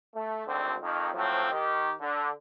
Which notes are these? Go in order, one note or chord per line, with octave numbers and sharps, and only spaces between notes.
A3
G#1 D2 D3 C4
F2 D#3
A2 F3 F#3 C4
D#3 G4
D3